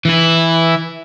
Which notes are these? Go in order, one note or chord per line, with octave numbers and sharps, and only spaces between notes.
E3 E4